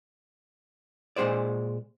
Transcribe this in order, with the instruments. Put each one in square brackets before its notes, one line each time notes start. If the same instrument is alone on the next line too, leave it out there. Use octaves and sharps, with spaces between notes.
[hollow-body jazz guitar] A#2 G#3 D#4 G#4 C5 D5